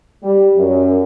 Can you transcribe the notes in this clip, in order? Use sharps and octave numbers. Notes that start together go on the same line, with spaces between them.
G3
F#2